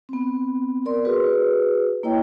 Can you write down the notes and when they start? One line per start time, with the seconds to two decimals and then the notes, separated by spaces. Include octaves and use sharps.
0.09 B3 C4
0.85 A#4 D5 C6
1.05 F#4 G#4 B4
2.03 A#3 E4 C#5 D#5 G5